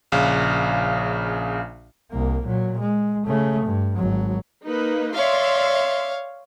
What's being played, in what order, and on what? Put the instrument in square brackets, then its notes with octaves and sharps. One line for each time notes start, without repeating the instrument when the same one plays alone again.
[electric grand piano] A#1 C#3 F5
[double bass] C2 A#3
A#2 F#3
G#3
C#3 A3
G2
G#1 F#3
[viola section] A#3 D#4 B4
[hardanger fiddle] C#5 F5 [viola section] D5 E5 C6